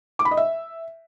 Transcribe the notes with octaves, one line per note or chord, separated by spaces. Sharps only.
D6
B5
D#5
E5